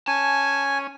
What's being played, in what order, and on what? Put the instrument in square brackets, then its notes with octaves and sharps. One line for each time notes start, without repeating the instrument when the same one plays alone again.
[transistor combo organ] C#4 [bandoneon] G#5 [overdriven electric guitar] A5